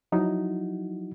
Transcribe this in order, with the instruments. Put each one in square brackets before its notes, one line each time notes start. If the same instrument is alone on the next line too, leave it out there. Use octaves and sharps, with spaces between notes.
[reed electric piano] F3 F#3 D#4 E4 F#4